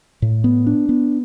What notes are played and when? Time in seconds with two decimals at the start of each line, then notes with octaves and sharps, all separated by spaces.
0.22 A2
0.44 B3
0.67 D4
0.89 B3